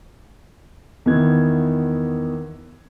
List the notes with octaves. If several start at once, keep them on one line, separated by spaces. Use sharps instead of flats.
E2 D#3 B3 E4 F#6 G#6